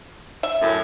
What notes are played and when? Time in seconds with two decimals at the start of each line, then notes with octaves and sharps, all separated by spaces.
0.43 E5
0.62 F#2 A2